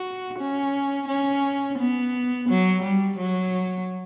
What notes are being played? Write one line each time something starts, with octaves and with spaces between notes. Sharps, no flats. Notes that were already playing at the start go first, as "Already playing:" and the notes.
Already playing: F#4
C#4
C#4
B3
F#3
G3
F#3